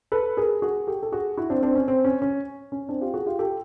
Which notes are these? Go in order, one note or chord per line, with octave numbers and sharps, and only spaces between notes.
A4 B4
G#4 A#4
F#4 G#4
G4 A4
A4
F#4 G#4
E4 F#4
C4 D4
C4 D4
C#4
C4
C#4
C#4
C#4
C4 D4
F4 G4
F#4 G#4
F4 G4
G4 A4